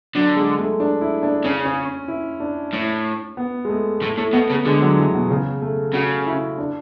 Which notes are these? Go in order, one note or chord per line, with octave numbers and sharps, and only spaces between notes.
D3 F#3
G#3
A3
D4
E4
D4
C#3 C#4
C#4
E4
D4
A2
B3
G#3
A3
A2 A3
A2 A3
B2 B3
C#3 A3
D3 G#3
F#3
E3
B2
C#3
A3
C#3 F#4
E4
D4